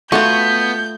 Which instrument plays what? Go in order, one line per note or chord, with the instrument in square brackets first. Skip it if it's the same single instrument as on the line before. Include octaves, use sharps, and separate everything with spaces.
[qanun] A3 C#5 [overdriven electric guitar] B3 [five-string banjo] F4 F#4 [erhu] G6